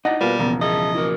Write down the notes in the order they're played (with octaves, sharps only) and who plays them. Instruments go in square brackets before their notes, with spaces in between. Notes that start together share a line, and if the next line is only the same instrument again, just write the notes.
[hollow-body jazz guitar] D#4 [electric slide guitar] E4 D5 D#5 [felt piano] F#5 A#6
[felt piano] B2 F4 [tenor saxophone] G3 [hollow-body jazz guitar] A#3 [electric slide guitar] B4
[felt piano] E1 [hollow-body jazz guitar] C#3 F3 A#3 [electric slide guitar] B3
[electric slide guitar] G#4 E5 A5 [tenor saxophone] D#5
[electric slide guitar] E4 F#4 A#4